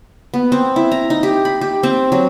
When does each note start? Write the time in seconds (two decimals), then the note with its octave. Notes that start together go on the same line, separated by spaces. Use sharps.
0.34 B3
0.52 C4
0.76 E4
0.92 A#5
1.10 D#4
1.23 G4
1.45 B5
1.61 G4
1.83 C4
2.12 F#3